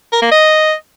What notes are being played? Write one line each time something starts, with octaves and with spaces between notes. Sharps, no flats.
A#4
A#3
D#5